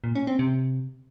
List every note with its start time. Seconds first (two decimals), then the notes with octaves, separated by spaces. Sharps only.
0.04 A#2
0.15 C#4
0.27 C4
0.39 C3